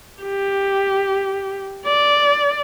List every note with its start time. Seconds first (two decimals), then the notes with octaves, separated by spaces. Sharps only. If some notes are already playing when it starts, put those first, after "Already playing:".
0.23 G4
1.86 D5